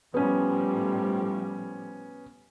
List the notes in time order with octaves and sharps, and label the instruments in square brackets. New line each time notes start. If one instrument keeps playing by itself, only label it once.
[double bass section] A2 F3 G3 [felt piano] B3 C#4